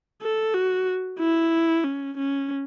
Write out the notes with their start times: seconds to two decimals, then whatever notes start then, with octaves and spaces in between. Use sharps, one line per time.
0.22 A4
0.54 F#4
1.19 E4
1.84 C#4
2.17 C#4